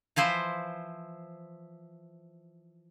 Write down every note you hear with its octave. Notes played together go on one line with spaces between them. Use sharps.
E3 F3 E4 C5